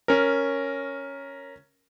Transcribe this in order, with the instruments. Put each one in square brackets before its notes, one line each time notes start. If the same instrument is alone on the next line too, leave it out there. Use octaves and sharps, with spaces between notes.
[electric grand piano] C#4 A#4